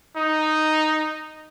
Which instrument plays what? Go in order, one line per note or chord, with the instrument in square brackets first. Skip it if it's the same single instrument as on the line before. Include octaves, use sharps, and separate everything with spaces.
[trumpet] D#4